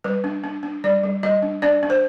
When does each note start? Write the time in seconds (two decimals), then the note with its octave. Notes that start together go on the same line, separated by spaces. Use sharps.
0.04 G3 B4
0.24 D4
0.44 D4
0.63 D4
0.84 G3 D5
1.03 G3
1.23 G3 D#5
1.42 D4
1.62 D4 D5
1.83 D4
1.90 C5